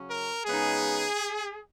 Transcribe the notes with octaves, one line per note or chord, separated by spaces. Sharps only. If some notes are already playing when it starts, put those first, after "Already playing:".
Already playing: C#3 F#3 C#4
A#4
C#3 G#3 B3 D#4 G#4